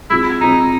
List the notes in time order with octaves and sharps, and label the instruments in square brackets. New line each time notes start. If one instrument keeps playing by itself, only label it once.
[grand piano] G#3 C4 F4 [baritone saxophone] E4
[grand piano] G#3 C4 F4 [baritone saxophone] D#4